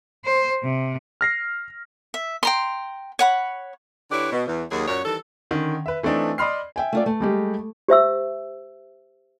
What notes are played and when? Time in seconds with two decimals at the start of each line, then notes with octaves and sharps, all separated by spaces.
0.25 C5
0.63 C3
1.21 F6 A#6 C7
2.14 E5
2.43 G5 A#5 C6
3.19 C#5 F#5 B5
4.11 D3 E4 G4 B4 C#5 D5
4.32 B2
4.47 E2
4.71 D#2 F#3 G#4
4.87 F#2 A#2 C#5
5.05 D#3 E3 G3 A4
5.51 D3 D#3 C#4
5.86 B4 E5
6.03 E3 A3 C4 D4 D#4
6.38 D5 D#5 B5 C6 F6 C7
6.76 E5 G5 G#5
6.93 A3 F4 D5
7.06 A3
7.20 G3 G#3 G4
7.88 G4 C5 E5 E6